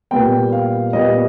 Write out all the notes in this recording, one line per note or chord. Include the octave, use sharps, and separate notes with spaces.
A#2 G3 B3 G5
F5
A#2 G3 B3 D#5